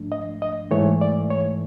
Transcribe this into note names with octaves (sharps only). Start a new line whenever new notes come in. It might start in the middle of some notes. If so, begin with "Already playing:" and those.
Already playing: G#2 F3 A3 D4
D#5
D#5
G#2 E3 A3 C#5
D5
C#5